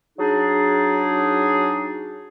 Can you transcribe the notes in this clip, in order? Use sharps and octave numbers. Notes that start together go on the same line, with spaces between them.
F#3 D4 D#4 G#4